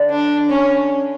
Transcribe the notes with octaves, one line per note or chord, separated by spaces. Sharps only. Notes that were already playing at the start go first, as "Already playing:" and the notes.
Already playing: D3
D4
C#4